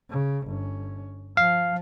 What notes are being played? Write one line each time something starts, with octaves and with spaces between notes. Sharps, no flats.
C#3
G1 C#4
F3 F5